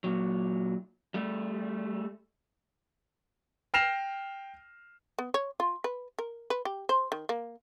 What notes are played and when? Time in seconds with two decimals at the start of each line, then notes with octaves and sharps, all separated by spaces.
0.04 A#2 F#3
1.14 G3 A3
3.74 G5 F6 A#6 C7 E7 F7
5.19 B3
5.34 C#5
5.60 F4
5.84 B4
6.19 A#4
6.50 B4
6.65 G4
6.89 C5
7.12 D#3
7.29 A#3